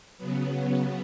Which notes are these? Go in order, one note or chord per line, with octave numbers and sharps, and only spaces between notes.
C#3 F#3 B3
B3